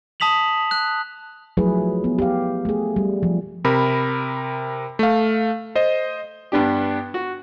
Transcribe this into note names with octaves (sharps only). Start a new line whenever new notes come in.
A5 D#6 B6 F7 F#7
F#6
F3 F#3 A3 E4 G#4 B4
B3
G4 F5
A3 G#4
G3
F3
C3 A#4 B5
A3 F5
C5 D#5
G2 B3 D4 G4
F#4